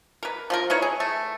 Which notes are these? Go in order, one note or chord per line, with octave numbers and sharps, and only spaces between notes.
A#4 B4
F3 F4 A#4
D#4 E4 B4 C#5
G#4
A3